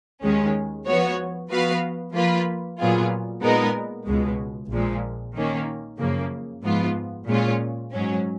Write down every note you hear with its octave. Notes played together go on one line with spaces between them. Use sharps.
D#2 D#3 G#3 C#4
F3 B3 F#4 C#5
F3 B3 F#4 B4 F5
F3 A#3 F4 B4
A#2 F#3 B3 F4 G#4
A#2 G#3 B3 D#4 A#4
C#2 B2 G#3
A#1 A#2 F3 G#3
D#3 A#3 C#4
F#2 C#3 F3 A#3
G#2 F3 B3 F4
A#2 G#3 C#4 F4
G#2 F#3 C#4